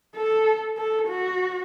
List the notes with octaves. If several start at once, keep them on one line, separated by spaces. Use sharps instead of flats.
A4
A4
F#4